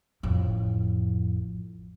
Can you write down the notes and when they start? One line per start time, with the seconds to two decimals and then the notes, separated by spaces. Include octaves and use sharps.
0.23 A1 F2